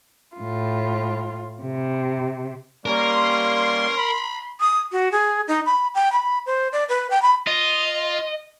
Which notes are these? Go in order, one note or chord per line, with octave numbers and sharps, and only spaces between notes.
A2 F4
C3
G3 A#3 C#4 A#4 C6
B5
D#6
F#4
G#4
D#4
B5
G5
B5
C5
D5
B4
G5
B5
F4 D#5